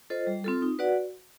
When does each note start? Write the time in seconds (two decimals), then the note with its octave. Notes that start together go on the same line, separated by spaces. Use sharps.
0.10 F4 A4 C5 D#5
0.27 G3
0.44 C4 F4 A4
0.62 D#4
0.79 F#4 B4 D5 F#5